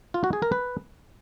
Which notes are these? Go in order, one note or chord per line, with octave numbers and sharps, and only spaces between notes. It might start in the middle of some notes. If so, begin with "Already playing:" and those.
F4
F#4
G#4
A#4
B4